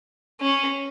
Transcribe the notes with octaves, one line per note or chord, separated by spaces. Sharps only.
C#4